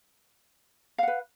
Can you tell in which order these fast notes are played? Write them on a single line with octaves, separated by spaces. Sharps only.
F5 F#5 B4